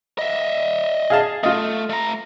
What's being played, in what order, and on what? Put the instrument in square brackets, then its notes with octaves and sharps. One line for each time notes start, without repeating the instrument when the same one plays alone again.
[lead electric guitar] D#5 E5
[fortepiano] G#4 F5 A5
[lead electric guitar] A3 [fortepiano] F4 D#5
[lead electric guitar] A3 A#5